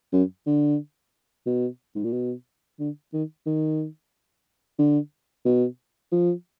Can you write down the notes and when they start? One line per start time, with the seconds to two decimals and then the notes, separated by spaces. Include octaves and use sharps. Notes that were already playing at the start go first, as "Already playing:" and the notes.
0.13 F#2
0.46 D3
1.46 B2
1.95 G#2
2.04 A#2
2.13 B2
2.79 D3
3.13 D#3
3.46 D#3
4.79 D3
5.45 B2
6.12 F3